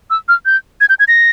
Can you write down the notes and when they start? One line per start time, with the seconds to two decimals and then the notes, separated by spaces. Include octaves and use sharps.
0.10 E6
0.28 F6
0.46 G6
0.81 G#6
0.89 G6
0.99 G#6
1.08 A#6